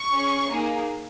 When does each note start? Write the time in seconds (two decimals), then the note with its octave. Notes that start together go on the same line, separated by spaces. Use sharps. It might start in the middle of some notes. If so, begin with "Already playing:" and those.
Already playing: C#6
0.11 C#4 G#4
0.49 A#3 D#4 G#4